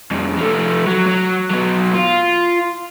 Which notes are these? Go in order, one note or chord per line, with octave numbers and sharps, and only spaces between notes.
C2 F2
F3 A3
F#3
F#3
B2 F#3
F4